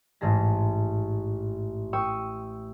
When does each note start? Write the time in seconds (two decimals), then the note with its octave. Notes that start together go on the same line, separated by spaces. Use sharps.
0.21 A1 G#2 G#4 A5 A#6
1.93 G5 C#6 D#6 E6